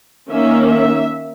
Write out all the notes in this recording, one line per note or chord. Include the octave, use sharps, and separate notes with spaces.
D#3 A#3 C#4 E5
E5